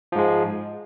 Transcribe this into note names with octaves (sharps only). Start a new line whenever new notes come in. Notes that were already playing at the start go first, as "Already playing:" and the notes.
G#2 F3 G#3